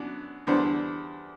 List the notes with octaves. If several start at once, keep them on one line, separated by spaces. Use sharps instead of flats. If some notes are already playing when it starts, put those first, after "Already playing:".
Already playing: F#2 B3 D4
E2 D3 G3 D4 C5